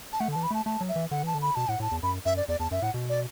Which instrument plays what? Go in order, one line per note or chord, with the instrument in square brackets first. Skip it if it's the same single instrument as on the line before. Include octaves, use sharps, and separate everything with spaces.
[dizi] A5
[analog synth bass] A3 [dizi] F#5
[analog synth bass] D3
[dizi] A5
[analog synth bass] E3
[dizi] B5
[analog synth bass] A3 [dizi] A5
[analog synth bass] A3 [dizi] A5
[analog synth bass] F#3
[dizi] E5
[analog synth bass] E3
[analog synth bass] D3 [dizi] F#5
[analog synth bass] E3 [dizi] A5
[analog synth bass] D3
[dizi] B5
[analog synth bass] B2 [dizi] A5
[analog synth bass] A2 [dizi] F#5
[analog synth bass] A2 [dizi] A5
[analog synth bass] E2
[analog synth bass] F#2 [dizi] B5
[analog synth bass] F#2 [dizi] E5
[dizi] D5
[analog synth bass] E2 [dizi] D5
[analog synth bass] E2 [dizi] A5
[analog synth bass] F#2 [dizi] E5
[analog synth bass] A2 [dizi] F#5
[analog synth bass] B2
[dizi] D5